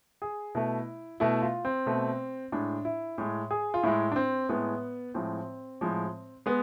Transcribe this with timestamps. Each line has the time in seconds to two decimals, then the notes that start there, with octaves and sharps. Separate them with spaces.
0.22 G#4
0.55 B2 A3 E4
1.20 B2 A3 E4
1.42 F4
1.65 C4
1.86 B2 A3
2.52 A2 G#3 D4
2.85 E4
3.18 A2 G#3
3.51 G#4
3.74 F4
3.83 A2 G#3 E4
4.12 D4
4.16 C4
4.49 A2 G#3 B3
5.14 A2 F3 G#3 C4
5.81 A2 F3 G#3
6.46 G#3 B3